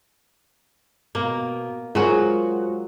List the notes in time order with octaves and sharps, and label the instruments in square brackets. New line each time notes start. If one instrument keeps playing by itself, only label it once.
[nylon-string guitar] B2 [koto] A#3
[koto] F#3 F#4 [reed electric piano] G#3 A#4 C5 [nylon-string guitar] F4 G#4